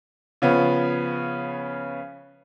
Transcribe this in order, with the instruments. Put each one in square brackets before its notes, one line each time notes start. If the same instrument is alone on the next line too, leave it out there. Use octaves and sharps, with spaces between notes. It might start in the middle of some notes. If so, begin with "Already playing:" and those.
[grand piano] C#3 F3 B3 C#4